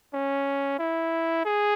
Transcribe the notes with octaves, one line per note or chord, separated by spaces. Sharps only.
C#4
E4
G#4